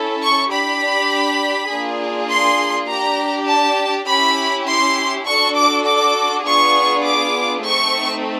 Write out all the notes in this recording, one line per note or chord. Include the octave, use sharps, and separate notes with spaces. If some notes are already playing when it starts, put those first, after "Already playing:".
Already playing: C#4 E4 A4
C#6
D4 G4 B5
A#3 D4 F4 G#4
C6
D4 G4 A#5
A5
C#4 E4 G4 B5
C6
D4 F#4 A4 C#6
D6
D6
B3 D4 F4 G#4 C#6
D6
A3 C4 D#4 C#6